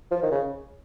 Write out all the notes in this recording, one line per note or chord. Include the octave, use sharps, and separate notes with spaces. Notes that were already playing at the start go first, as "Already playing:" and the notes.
F3
D#3
C#3